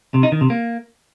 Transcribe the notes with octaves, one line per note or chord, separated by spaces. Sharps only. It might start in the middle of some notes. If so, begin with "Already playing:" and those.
C3
D#4
D#3
C3
A#3